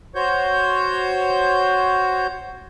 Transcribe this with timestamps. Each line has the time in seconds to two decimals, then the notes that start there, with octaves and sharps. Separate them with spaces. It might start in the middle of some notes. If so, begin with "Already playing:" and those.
0.15 F#4 C5 C#5 G6